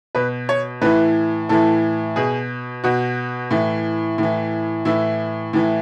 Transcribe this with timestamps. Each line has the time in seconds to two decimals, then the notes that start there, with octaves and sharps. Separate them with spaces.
0.15 B2 B4
0.49 C#5
0.82 A2 E3 B4
1.49 A2 E3 A4
2.16 B2 G#4
2.84 B2 F#4
3.51 A2 E3
4.18 A2 E3
4.85 A2 E3 E4
5.53 A2 E3